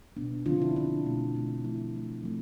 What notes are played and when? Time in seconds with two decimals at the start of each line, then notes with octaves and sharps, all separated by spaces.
0.17 B2 B3 D4
0.46 D3 F3 C4 D4 F4
0.62 E4
0.76 D3 F3 C4 D4
1.06 B2 A3 C4
1.35 B2 A3 C4
1.64 F3 A3 C4 E4
1.93 F3 A3 C4
2.23 F3 A3 C4